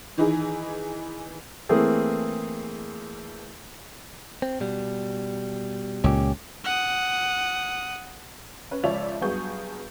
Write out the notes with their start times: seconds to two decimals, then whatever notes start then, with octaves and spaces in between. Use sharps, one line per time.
0.17 D#3 E3 D#4 E4 G#4
1.69 E3 A3 A#3 C4 G#4
4.42 C4
4.60 B2 G3
6.04 C#2 A#2 C#4 G4
6.64 F#5 D#6
8.71 C#4 B4
8.83 C#2 F3 C#5 D5 E5 F7
9.21 G2 F#3 B3 G#4 C#6 G6